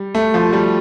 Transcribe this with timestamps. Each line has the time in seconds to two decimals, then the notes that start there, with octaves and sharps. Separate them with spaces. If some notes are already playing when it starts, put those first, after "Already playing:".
Already playing: G3
0.15 A3
0.34 F3
0.53 G3